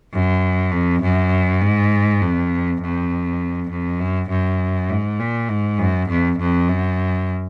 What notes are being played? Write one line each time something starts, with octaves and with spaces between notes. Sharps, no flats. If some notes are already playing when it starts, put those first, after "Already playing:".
F#2
F2
F#2
G#2
F2
F2
F2
F#2
F#2
G#2
A#2
G#2
F#2
F2
F2
F#2